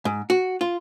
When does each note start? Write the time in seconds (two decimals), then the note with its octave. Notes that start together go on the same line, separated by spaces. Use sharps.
0.05 G#2
0.30 F#4
0.61 F4